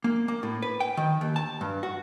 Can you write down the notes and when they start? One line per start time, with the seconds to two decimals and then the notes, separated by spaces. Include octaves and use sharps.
0.04 A#3
0.28 A#3
0.43 A2
0.62 B4
0.80 G5
0.97 D#3
1.21 D#2
1.36 A5
1.61 G2
1.83 F#4